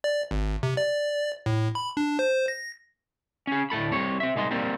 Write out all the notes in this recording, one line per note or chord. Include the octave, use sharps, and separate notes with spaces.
D5
G#1
C3
D5
A2
B5
D4
C5
A#6
C#4 G#4
D2 A2 A3 A4 B5
C2 C3 C#5
C4 E5
C2 G#3 D#4 C6
G3 A#3 C4